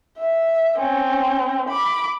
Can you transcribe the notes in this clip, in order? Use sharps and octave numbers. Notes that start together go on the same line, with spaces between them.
E5
C4 C#4
B5 D6